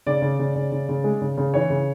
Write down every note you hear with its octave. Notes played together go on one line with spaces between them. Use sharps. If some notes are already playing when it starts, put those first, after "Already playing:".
C#3 D5
C#3
C#3
C#3
C#3
C#3
G#3
C#3
C#3
E3 C#5
C#3